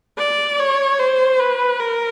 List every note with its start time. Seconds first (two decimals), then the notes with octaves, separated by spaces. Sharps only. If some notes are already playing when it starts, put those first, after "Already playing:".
0.18 D5
0.59 C#5
0.99 C5
1.39 B4
1.79 A#4